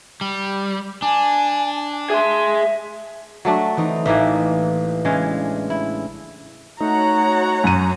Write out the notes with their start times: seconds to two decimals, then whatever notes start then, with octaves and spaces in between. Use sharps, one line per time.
0.21 G3
1.02 D4 G#5
2.10 G#4 E5 C6
3.45 F#3 A3 D4
3.77 E3 C4 D#4
4.06 A1 E3 A#3 E5
5.05 C#3 E3 G#3 D4
5.70 E4
6.80 A3 D#4 F#4 C#5 F#5 A#5
7.64 F#2 D#7